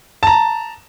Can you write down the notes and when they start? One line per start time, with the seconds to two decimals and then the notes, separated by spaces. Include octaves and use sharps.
0.23 A5 A#5